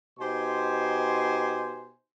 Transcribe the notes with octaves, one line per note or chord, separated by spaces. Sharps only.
B2 D#4 G4 C5 G#5 C6